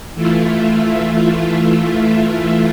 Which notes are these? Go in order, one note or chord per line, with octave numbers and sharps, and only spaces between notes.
E3 A3 E4 F4